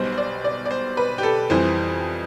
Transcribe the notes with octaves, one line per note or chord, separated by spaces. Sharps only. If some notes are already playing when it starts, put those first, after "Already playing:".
Already playing: B1 B2 G3 C5
C5
D5
D5
D5
C5
B4
G4
A4
F2 E3 G3 C5